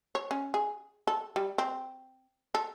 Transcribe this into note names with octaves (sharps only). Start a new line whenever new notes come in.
C#5
C#4
G#4
A4
G3
C4
A4